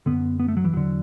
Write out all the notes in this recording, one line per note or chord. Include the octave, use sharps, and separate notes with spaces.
F#2 D3 B3
B3
A3
F#3
E3
E2 D3 F#3